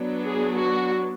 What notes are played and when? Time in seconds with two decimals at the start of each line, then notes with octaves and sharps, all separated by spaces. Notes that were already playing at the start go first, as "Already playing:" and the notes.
Already playing: F#3 B3 D4
0.26 G#4
0.61 F#4